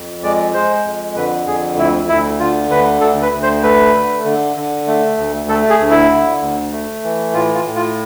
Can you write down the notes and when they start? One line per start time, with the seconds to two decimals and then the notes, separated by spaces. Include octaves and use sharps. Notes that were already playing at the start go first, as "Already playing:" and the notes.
Already playing: F2
0.23 G#3 D5
0.54 G#3 C5
0.84 F2
1.16 D3 B4
1.47 F2 G#4
1.77 D2 E4
2.09 D2 E4
2.39 D3 F4
2.70 D2 B4
3.01 D2 A4
3.22 B4
3.33 D2
3.43 C5
3.63 A3 B4
3.95 D3
4.25 D3
4.56 D3
4.87 A3
5.17 D2
5.49 A3 A4
5.70 G#4
5.79 D2
5.90 E4
6.11 D3
6.42 D2
6.72 A3
7.04 E3
7.34 A2 F4
7.55 F4
7.65 A2
7.76 F4